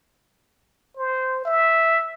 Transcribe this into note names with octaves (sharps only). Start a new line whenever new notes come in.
C5
E5